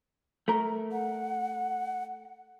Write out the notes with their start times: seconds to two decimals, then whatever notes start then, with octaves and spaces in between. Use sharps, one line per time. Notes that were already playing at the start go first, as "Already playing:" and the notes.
0.48 A3 A#4
0.92 F#5